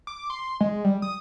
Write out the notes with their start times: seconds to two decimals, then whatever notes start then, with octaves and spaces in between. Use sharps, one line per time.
0.07 D6
0.30 C6
0.61 G#3
0.84 G3
1.02 D#6